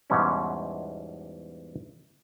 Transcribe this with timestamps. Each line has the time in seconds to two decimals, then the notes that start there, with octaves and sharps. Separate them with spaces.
0.10 E2 G#2 B2 E3 G3 C#4